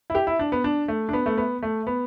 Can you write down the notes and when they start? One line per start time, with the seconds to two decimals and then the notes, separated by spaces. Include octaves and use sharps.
0.10 E4
0.15 G4
0.27 E4
0.39 D4
0.52 B3
0.64 D4
0.88 A3
1.09 D4
1.13 B3
1.26 A3
1.37 B3
1.63 A3
1.87 B3